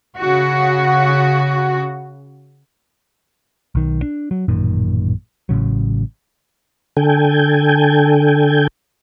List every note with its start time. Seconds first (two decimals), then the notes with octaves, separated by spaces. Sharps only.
0.17 C#3 F#4
3.75 B1 D#3
4.02 D4
4.31 F#3
4.48 A1 F#2 A#2 D#3
5.49 A1 A2 C#3 F#3
6.97 D3 A4 G5 G#5